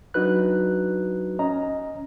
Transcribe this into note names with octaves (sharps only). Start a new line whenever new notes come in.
F#3 D4 D#4 F#4 B4 F#6
C#4 D#5 A#5